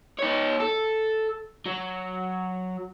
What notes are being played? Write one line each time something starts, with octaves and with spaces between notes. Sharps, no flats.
D#4 C#5
A4
F#3